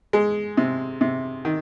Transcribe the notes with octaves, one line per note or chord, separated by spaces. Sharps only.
G#3
C3
C3
D#3